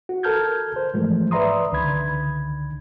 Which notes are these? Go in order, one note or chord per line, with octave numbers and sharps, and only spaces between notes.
F#4
A4 A#4 A5 F6 G6 G#6
C5
G#2 E3 F3 G#3 A3
B4 D5 E5 A#5 C6 D#6
C#2 D3 D#3 B5 G#6